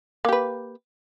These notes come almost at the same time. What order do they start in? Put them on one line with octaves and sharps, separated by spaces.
A#3 G4 B4